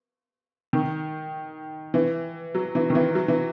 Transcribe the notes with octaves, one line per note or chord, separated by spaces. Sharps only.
D#3
E3
F#3
E3
D#3
E3
F#3
E3